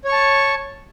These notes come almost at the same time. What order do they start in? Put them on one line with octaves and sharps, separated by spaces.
C#5 C#6 A5